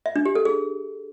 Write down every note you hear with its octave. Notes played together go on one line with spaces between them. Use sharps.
E5
D4
G4
A4
G#4